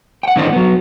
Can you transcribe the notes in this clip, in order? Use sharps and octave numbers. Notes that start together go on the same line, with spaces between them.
F#5 G5
G#2 D#3 E3 C4 D4 D#4
F#3 B3